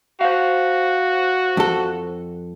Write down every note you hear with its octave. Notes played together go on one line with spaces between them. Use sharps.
F#4 C5 F5
F2 A4